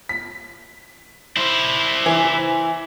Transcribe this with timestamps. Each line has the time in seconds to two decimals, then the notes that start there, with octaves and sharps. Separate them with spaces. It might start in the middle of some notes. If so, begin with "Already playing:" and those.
0.09 B6
1.37 E4 C5
2.06 E3